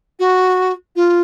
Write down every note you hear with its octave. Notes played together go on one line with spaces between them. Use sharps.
F#4
F4